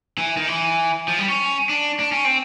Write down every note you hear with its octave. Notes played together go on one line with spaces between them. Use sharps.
E3
D#3
E3
F3
G3
C#4
D4
D4
C#4
C4